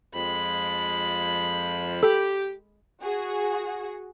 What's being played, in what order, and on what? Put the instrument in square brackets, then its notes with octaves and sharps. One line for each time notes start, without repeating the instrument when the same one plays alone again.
[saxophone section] F2 F3 [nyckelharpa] G#3 B5
[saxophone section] G4 [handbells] A4
[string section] F#4 G#4